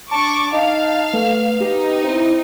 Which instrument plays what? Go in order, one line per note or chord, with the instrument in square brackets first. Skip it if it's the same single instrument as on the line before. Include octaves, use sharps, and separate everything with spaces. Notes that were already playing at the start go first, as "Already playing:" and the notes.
[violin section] D4 C#6 D6 [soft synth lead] A5
[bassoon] D#4 [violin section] F5
[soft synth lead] A3 [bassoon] B3
[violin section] D#4 [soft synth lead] G4
[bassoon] C4 [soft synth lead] E4